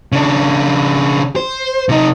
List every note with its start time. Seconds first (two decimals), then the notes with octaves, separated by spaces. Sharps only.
0.12 C#3 D4
1.36 C5
1.89 C3 D#4